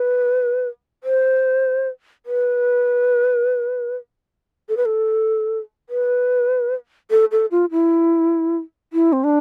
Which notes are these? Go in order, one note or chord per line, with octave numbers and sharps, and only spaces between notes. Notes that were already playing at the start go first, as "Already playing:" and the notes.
Already playing: B4
C5
B4
A4
B4
A4
B4
A4
A4
F4
E4
E4
C4
D4